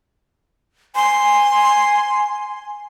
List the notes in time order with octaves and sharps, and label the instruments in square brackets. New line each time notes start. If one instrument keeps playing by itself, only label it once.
[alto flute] G#5 [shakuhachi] C6